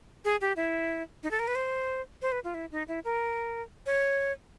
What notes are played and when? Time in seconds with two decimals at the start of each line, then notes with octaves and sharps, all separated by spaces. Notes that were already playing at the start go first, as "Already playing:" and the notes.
0.25 G#4
0.41 G4
0.56 E4
1.23 D#4
1.31 A4
1.39 A#4
1.47 B4
1.55 C5
2.22 C5
2.32 B4
2.44 F4
2.54 E4
2.72 D#4
2.88 E4
3.04 A#4
3.86 C#5